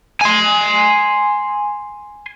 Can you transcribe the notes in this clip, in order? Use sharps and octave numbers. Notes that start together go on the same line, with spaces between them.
G#5 C6